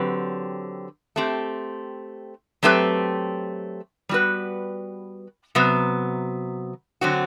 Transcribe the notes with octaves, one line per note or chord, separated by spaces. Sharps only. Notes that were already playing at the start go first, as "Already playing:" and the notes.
Already playing: D3 F#3 C4 G4 B4
A3 C4 G4
F#3 A3 C4 G4 B4
G3 B3 F#4 B4
C3 F#3 B3
D3 F#3 C4 F#4